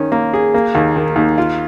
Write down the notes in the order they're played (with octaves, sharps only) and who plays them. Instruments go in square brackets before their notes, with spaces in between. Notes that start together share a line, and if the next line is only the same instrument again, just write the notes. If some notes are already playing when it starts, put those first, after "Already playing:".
Already playing: [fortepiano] D#3 C#4
A#3
G#4
A#3
D#2
D#3
D#2
F4